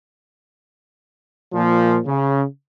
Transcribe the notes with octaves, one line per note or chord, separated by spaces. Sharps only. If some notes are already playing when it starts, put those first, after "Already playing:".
A#2 F3
C#3